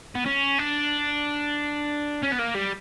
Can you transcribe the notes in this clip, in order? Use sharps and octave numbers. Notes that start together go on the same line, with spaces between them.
B3
C#4
D4
C#4
B3
A#3
G3